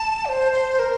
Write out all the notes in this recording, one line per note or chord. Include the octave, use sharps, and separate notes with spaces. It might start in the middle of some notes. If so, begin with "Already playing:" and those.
Already playing: A5
D5
C5
C5
A#4